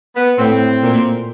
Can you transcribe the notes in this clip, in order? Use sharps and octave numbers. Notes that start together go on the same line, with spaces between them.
B3
A2 C4
A#2